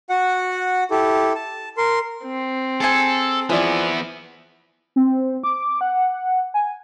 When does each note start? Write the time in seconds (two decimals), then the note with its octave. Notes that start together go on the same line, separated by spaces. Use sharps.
0.10 F#4 F#5
0.91 E4 G4 A4
1.35 A5
1.77 A#4 C6
2.24 C4
2.80 G#4 A4 C5 G#5
3.49 E3 F3 B3 E4 G#4 D5
4.96 C4
5.44 D6
5.81 F#5
6.54 G#5